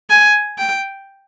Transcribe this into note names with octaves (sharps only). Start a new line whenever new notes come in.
G#5
G5